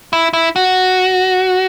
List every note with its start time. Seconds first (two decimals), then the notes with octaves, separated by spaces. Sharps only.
0.13 E4
0.33 E4
0.56 F#4